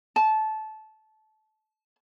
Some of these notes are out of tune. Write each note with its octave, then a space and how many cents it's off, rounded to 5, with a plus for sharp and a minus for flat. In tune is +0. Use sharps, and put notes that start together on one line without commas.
A5 -20